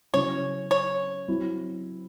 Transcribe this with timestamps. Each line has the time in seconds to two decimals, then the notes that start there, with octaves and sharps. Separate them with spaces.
0.14 C#3 F#3 C#4 E4 C#5
0.71 C#5
1.28 F#3 C4 E4